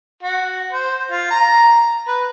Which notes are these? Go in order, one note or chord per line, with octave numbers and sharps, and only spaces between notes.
F#4
C5
F4
A#5
B4